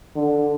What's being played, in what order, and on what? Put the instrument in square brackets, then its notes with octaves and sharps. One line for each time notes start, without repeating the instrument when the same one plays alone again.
[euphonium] D3